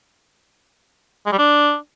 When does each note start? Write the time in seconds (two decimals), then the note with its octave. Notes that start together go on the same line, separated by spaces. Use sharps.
1.26 G#3
1.32 G3
1.38 D4